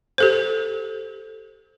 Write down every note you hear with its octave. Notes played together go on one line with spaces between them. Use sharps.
G4 A4 C5